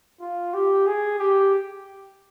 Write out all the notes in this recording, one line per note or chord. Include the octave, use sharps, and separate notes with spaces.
F4
G4
G#4
G4